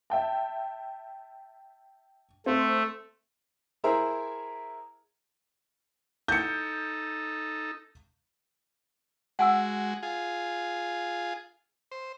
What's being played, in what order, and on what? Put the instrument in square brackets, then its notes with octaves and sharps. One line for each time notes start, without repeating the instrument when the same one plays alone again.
[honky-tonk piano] E5 G5 A5
[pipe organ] A3 [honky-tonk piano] C4
[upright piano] E4 G#4 A#4 C5 E5 A#5
[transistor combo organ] D#4 A4 [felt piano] G6 C#7
[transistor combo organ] G#3 F#4 [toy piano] F#5 G#5 E6
[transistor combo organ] F4 G#4
C5